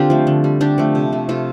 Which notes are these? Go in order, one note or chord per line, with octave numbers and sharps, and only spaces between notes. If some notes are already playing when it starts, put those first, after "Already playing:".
Already playing: D3 C4 D4 F4 G4
F3 A3
D3
G3
D3 D4 G4
F3 A3
C3
A3
C3 F4 A4